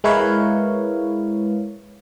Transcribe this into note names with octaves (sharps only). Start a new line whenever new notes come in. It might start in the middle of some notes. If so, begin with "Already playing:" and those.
G#3 E4 A#4 B4 C#5 F5